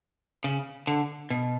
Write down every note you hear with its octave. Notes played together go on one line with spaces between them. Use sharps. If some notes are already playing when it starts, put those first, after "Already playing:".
C#3
D3
B2